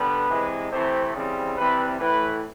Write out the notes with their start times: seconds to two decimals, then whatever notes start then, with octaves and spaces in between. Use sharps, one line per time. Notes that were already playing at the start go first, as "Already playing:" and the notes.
Already playing: D3 G3 B3 B4
0.30 C3 E3 G#3
0.72 C3 E3 A3 C4 C5
1.14 C#3 E3 G3 C4
1.56 C3 E3 G3 C4 B4
1.99 A2 E3 A3 B4